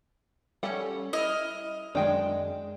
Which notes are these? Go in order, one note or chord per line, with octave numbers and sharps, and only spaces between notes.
G3 C#4 A4 F#5
E4 D#5 F6
F#2 D#3 G#3 D4 G5